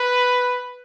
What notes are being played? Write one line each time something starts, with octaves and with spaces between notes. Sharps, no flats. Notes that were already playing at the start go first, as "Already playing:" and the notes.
Already playing: B4